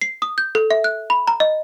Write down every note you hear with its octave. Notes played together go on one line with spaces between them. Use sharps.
C7
D#6
G6
A4
E5
F#6
B5
A#5
D#5